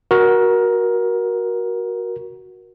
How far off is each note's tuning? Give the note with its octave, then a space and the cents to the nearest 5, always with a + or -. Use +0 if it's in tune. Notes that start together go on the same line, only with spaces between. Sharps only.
F#4 +0 A#4 +20